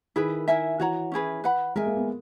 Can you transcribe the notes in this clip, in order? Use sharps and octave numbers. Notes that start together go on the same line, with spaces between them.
D#3 E4 G#4 B4
E4 A#4 E5 G#5
E3 F#4 C#5 F#5 A#5
C#4 E4 G#4 B4
B4 F#5 B5
G#3 A#4 E5 G#5
A#3
B3